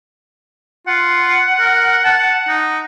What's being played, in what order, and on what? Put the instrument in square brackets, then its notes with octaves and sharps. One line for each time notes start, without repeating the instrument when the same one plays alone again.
[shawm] F4 [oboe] F#5
[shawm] A#4
A5
D#4